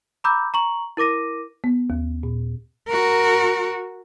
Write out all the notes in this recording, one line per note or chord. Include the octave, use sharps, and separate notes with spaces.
A#5 B5 D6 E6 G6
A#5 C#6 F#7
E4 A#4 D6 A#6 D#7
B3
D#2
A#2
F#4 A#4